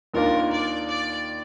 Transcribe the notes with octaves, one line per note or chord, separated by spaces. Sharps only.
D#2 D#3 A#3 D4 F4 A#4
D5
D5